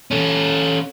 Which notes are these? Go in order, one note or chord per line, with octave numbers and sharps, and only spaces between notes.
C#4 A4